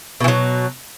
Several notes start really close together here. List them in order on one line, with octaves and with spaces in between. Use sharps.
B2 E3 F#3